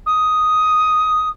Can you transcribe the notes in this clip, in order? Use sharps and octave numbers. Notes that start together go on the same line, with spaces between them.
D#6